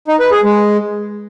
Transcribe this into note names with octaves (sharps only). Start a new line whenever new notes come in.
D#4
B4
G#4
G#3